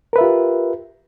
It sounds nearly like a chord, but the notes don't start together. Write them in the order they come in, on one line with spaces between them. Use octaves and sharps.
A#4 B4 E5 F4 G4